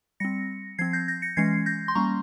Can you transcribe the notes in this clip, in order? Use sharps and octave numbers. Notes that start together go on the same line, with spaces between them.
G3 C4 A#6 C#7
F3 C4 G#6 C7
G6 A#6
G6 A#6
A#6 C#7
E3 G#3 C#4 G#6 C7
G6 A#6
C6
G3 A#3 C#4 A#5 C#6